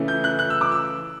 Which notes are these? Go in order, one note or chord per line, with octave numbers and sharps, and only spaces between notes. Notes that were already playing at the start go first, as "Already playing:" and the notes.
Already playing: C#3 E3 A3 C#4
G6
F#6
F#6
E6
D6
E6